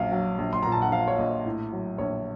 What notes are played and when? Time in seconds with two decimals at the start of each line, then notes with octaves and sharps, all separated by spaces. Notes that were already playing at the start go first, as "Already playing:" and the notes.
Already playing: A#1 F#3 F5
0.12 F#3
0.38 A#1
0.53 C6
0.63 A#2 A#5
0.72 A5
0.82 F#5
0.92 F3 F5
1.08 C#5
1.18 A#1 D#5
1.46 A2
1.73 F#3
1.98 A#1 C#5